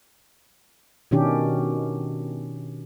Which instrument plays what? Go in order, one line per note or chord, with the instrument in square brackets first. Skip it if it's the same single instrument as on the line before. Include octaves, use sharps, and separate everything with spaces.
[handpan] B2 D#3 C#4 D4 G4